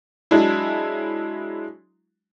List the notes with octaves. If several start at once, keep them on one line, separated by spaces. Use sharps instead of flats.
F#3 G#3 D4 E4